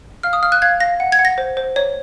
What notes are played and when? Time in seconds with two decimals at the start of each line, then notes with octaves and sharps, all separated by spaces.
0.23 F5 F6
0.33 D#6
0.43 F5 F6
0.52 F#6
0.62 F5 G#6
0.80 F5 A#6
1.00 F#5
1.12 G#6
1.19 F#5
1.25 A#6
1.38 C5
1.57 C5
1.76 C#5